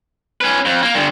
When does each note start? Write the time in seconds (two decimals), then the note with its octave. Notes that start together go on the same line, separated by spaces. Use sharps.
0.41 C#4 B4
0.65 F2
0.83 A#3
0.94 G2 D3